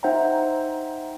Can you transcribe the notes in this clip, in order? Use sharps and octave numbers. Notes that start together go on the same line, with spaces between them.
D#4 C5 E5 F#5 G5 A#5